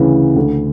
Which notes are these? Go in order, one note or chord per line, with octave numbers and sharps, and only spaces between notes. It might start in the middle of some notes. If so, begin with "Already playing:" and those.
Already playing: D2 C#3 E3
D2